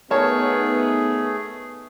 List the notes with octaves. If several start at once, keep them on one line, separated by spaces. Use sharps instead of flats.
A3 B3 D#4 G#4 A#4 C#5 A5